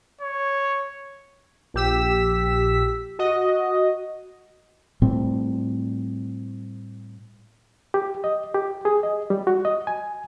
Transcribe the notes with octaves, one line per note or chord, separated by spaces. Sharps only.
C#5
A#1 G4 E6 B6
F#4 D#5
A2 G3 A3 C4
G4
D#5
G4
G#4
D#5
G3
F#4
D#5
G#5